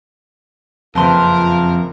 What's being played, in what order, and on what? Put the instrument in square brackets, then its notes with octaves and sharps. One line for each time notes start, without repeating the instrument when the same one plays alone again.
[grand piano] F#1 C4 B4 [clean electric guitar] F2 C6 [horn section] F4 A#4 [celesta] A5